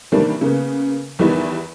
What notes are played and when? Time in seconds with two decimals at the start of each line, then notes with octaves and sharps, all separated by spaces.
0.12 D#3 E3 G3 A#3 C4 D4
0.41 C#3 A#3 B3
1.19 E2 D#3 E3 G3 B3 E4